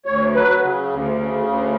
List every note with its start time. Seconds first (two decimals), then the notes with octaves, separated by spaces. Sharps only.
0.06 D2 C#5
0.34 F#3 B4
0.61 C#3
0.90 D2
1.17 C#3
1.44 D2